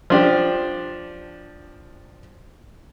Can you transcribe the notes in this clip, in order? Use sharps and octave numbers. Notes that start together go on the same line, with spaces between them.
F3 D4 G4